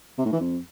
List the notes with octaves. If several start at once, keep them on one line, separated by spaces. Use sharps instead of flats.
C3
A2
E3
F2